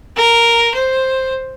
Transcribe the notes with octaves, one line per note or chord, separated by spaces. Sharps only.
A#4
C5